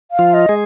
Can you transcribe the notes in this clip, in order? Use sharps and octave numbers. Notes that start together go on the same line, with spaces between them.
F5
F3 F4
D#5
G#3 G#4